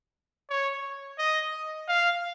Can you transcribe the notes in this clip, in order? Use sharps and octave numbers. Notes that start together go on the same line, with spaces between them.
C#5
D#5
F5